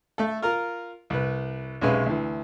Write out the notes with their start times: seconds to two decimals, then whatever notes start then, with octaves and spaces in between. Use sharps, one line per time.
0.18 A3 A4
0.42 F4 A#4 A#5
1.10 C2 B4
1.81 B1 C3 G#3 C#4 B4 F5
2.06 D2 E3